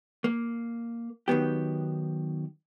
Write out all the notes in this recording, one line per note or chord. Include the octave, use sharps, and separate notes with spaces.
A#3
D#3 F#3 B3 G4